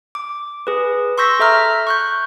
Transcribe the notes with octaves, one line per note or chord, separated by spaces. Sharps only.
D6
G#4 B4
C6 C#6 E6 G6 A#6 B6
A4 E5 A#5 F6
C#6 F#6 G6